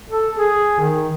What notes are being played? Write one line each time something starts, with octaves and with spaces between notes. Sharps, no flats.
A4
G#4
D#3